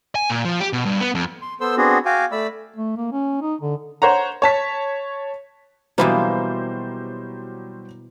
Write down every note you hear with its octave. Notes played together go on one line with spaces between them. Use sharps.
G#5
A#2
F3
G4
B2
G2
B3
F2
C6
B3 A4 C5 C6 E6
B3 C4 D4 F#4 G#4
F#4 F5 G5 G#5 D6
A3 D5 B5 E6
A3
A#3
C#4
D#4
D3
C5 C#5 F#5 A#5
C#5 A5 B6
B2 E3 F#3 G3 A#3 C5